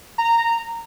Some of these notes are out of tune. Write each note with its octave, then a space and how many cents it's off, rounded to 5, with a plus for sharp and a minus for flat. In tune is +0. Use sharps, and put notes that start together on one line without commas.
A#5 -15